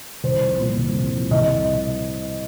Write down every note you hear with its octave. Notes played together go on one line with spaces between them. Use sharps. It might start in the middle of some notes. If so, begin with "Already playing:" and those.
C2 C5
F3
A#2
C2
C2
F3
C2 D#5